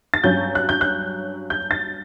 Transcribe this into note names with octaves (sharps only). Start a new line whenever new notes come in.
A6
G2 F#3 C#4 G6
F#6
G6
F#6
G6
A6